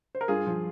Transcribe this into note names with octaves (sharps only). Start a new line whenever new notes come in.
C5
A#4
G2 F4 G#4
F3